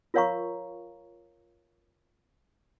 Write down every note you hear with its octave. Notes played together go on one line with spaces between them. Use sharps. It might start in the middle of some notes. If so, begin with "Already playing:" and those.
F4 A#4 C#5 F5 A#5 C#6